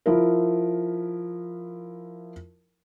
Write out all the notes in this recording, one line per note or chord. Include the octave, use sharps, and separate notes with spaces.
F3 E4 A#4